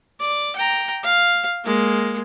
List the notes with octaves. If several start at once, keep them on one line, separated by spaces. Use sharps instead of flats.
D5
G5 A#5
F5
G#3 A#3